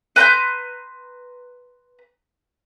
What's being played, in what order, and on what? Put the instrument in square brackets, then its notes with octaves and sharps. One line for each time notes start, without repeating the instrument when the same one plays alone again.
[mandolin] B4 A#5 C6 G6